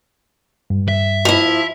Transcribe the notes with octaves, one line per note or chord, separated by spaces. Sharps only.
G2
E5
F3 E4